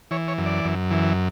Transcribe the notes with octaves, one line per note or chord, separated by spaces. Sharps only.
E3 C#5
C#5
F#2
D5
F#2
E3